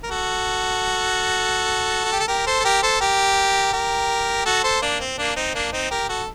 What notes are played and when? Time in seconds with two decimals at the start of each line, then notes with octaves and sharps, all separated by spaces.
0.04 A#4
0.10 F#4 A4
2.05 F#4
2.13 G4
2.20 A4
2.28 G4 A#4
2.46 A4 C5
2.60 A4
2.65 G4 A#4
2.83 A4 C5
3.01 G4 A#4
3.73 G4 A#4
4.46 F#4 A4
4.64 A4 C5
4.82 A#3 D4
5.00 C4
5.18 A#3 D4
5.36 C4 D#4
5.54 A#3 D4
5.73 C4 D#4
5.91 G4 A#4
6.09 F#4 A4